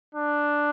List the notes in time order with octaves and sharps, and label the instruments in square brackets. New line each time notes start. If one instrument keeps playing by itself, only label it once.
[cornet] D4